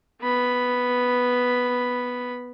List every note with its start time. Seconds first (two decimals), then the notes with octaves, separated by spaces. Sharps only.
0.22 B3 B5